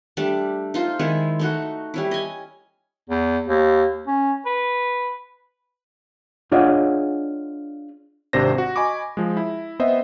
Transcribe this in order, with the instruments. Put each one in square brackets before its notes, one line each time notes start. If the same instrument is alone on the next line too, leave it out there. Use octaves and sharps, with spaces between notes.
[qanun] G3 A3 D4
D#4 F4 C5
D#3 G#3 D#4 E4
A3 D#4 F#4
G3 C#4 E4
D#5 G#5
[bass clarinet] E2
D#2
C#4
B4
[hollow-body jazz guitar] D4 F4 G#4 C#5 D#5 F#5
[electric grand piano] G#1 C3 D4 C5 A#6
F#4
D#5 G#5 B5 C#6 D6
F3 G#3
E4
B3 C4 C5 D#5 E5